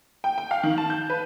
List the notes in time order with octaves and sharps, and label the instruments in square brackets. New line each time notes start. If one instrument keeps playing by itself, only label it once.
[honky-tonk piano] G5
G5
F5
D#3
A5
G6
B4